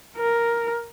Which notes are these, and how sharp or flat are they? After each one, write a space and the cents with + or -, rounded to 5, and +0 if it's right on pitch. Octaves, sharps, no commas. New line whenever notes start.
A#4 +5